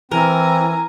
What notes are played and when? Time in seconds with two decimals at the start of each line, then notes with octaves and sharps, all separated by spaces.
0.11 E3 C4 A#4 G#5 A#5